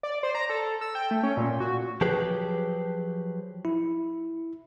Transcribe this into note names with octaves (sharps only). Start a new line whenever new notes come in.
D5
C5
A#5
A4
E6
G5
A3
C#4
A#2
F#4
F3 F#3 G4 G#4 B4
E4